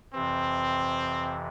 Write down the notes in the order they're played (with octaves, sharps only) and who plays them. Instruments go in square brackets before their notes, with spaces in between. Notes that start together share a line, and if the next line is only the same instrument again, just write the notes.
[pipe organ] F2 C3 E3 [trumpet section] C4